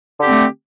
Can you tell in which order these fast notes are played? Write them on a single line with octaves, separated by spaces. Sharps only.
D3 G4 C4 A3